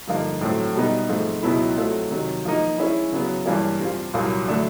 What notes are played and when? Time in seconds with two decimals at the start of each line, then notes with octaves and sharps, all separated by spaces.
0.07 G2 D3 F3 A#3 D#4
0.41 A2 F#3 A3 C4
0.75 B2 G3 B3 D#4
1.09 G#2 F3 A3 C4
1.43 C#2 B2 F#3 B3 E4
1.77 F#3 A3 C4 F4 A4
2.11 C3 D#3 F#3
2.45 F3 A#3 D#4
2.78 G#3 C#4 E4
3.12 C#3 F#3 B3
3.46 G2 E3 G3 A#3 C#4
3.80 G3 C4 F4
4.14 C2 A#2 F#3 A#3
4.48 D3 F#3 A3 D4